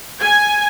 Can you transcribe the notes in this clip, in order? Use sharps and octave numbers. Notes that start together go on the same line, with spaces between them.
G#5